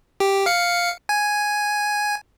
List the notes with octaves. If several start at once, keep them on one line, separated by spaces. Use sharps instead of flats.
G4
F5 C#7
G#5